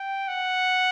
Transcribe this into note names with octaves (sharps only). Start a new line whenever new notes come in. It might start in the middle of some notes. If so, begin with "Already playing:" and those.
Already playing: G5
F#5